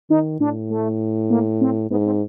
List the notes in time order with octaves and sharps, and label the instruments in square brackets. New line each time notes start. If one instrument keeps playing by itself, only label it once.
[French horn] D#3 [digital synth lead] D#4
[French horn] A2 [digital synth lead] D4
[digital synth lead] A3
A#3
C4
[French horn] G#2 [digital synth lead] B3
[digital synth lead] C4